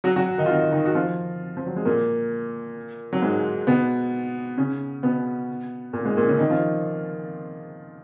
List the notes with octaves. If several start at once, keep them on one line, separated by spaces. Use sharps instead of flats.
F#3 F#4
F#3 F#4
D#3 D#4
F4
D#3 D#4
D#3 D#4
F#4
F3 F4
F3
F#3
G#3
A#2 A#3
F#3
G#2 G#3
B2 B3
C#3 C#4
B2 B3
A#2 A#3
G#2 G#3
A#2 A#3
C#3 C#4
D#3 D#4
F3 F4